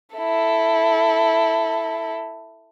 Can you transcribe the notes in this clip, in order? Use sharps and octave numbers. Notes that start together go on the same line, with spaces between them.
E4 A4